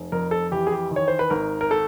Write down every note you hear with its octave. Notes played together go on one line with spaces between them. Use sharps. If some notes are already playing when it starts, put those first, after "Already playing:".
Already playing: F1
F2 A#4
A4
E3 G4
G#4
G4
D#3
C#5
C5
B4
G#1 A#4
A#4
A4